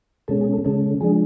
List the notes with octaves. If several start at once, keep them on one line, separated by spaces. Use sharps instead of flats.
B2 G#3 C#4 A4
G#4
A4
C#3 G#3 C#4 A4
F3 G#3 D4 G#4